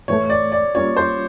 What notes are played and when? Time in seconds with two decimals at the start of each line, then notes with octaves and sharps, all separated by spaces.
0.08 A2 E3 A3 C#5
0.30 D5
0.52 D5
0.75 G3 A#3 C#4 F4 C#5
0.97 C5